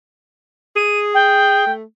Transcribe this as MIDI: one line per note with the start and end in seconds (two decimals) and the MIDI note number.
0.76 1.66 68
0.76 0.99 99
1.14 1.71 79
1.67 1.83 57